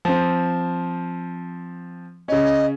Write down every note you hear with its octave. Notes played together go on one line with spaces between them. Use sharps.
F3 C4
C#3 C#4 D#5